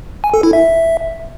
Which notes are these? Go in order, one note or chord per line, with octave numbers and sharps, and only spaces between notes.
G#5
A4
E4
E5